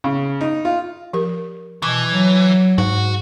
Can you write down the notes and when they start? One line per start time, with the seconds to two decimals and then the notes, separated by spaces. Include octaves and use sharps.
0.04 C#3
0.41 D#4
0.65 F4
1.13 F3 G4 A#4
1.82 B2 E3 C#6 D6
2.11 F#3
2.78 G#2 F#4 F#5